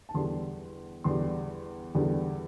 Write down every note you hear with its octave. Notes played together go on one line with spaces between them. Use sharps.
A5
E2 D3 G3 C6
E2 D3 G3 C6
E2 D3 G3